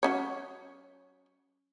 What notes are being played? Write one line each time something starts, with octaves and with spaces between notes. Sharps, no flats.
F#3 C#4 C#5